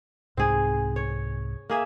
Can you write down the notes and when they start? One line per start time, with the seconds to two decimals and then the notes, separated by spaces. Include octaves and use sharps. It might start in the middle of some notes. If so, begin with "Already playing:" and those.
0.37 C2 G#2 C4 G#4
0.96 C#5
1.70 A#3 G#4 E5